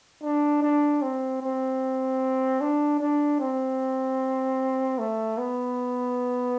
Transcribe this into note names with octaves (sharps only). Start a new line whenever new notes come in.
D4
D4
C4
C4
D4
D4
C4
A3
B3